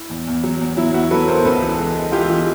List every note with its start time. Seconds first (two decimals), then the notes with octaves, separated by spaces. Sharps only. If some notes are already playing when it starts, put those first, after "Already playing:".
Already playing: E4
0.10 E2
0.27 E2
0.43 F#3
0.61 E2
0.77 F#3 E4
0.94 E2 E4 F#4
1.11 F#3 A4 B4
1.28 B3 A#4 C5
1.45 C#2 A4 B4
1.62 E3
1.78 G#3
1.96 G#3
2.12 E3 F4 G4
2.30 E3